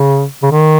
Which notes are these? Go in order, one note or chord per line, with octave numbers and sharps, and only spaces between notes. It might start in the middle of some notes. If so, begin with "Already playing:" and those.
Already playing: C#3
C#3
D#3